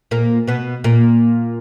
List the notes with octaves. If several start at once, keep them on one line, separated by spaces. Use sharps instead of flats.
A#2 A#3
B2 B3
A#2 A#3